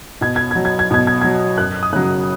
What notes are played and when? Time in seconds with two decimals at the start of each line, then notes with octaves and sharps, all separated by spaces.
0.21 B2 G#6
0.36 G#6
0.51 G#6
0.55 F#3
0.65 G#6
0.79 G#6
0.91 B2 G#6
1.07 G#6
1.21 F#3 G#6
1.58 F#2 F#6
1.83 D#6
1.93 C#3 F#3 F#6